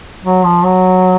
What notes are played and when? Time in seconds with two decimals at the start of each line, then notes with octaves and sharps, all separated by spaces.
0.23 F#3
0.44 F3
0.64 F#3